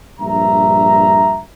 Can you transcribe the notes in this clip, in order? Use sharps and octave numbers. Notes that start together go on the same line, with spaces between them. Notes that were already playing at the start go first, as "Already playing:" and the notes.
A#1 G2 E5 A#5